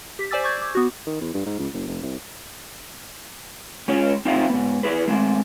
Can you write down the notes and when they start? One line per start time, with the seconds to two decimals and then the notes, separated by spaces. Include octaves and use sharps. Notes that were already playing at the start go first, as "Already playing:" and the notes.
0.19 G4 B6
0.31 C5 D5 G#5 D6 E6 A6
0.44 C#6 D6 G6 G#6
0.62 D6
0.75 B3 F#4
1.07 D#3
1.21 E2
1.34 G2
1.46 G#2
1.59 C#2
1.74 F#1
1.87 F1
2.03 C2
3.88 G#3 C#4 F4 G#4 C#5
4.25 C4 D#4 F4 C5 E5 F5
4.50 G#2 B3
4.83 E4 G#4 B4
5.08 G#3 A3 C4